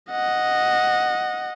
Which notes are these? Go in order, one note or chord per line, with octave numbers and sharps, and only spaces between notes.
D#5 F#5